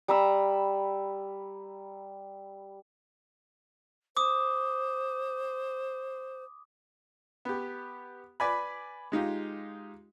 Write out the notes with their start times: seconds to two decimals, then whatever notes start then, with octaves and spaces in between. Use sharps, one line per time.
0.08 G3 A#5 B5 E6
4.17 C5 D6 D#6
7.45 B3 G4
8.40 B4 D5 G#5 B5
9.12 G#3 D#4 F4 G4